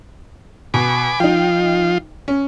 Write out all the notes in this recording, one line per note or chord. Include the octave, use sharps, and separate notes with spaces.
B2 G#5 B5 D6
F3 D#4 F4 G5
C#4